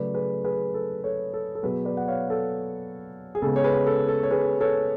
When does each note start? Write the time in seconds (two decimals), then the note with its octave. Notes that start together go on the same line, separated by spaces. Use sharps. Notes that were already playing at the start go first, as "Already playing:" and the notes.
Already playing: C#3 F#3 A3 B4 D5
0.14 G#4 B4
0.44 G#4 B4
0.74 A4
1.04 A4 C#5
1.34 A4
1.55 A4
1.63 B2 F#3 B3 G#4 B4
1.85 B4 D5
1.97 F#5
2.08 C#5 F5
2.30 A4
3.35 G#4
3.42 C#3 G#3 B3 A4
3.56 C#5
3.64 G#4 B4
3.86 A4
4.08 A4
4.23 C#5
4.31 G#4 B4
4.61 A4 C#5